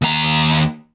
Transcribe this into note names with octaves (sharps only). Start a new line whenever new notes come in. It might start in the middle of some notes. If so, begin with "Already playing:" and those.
D#2 A#5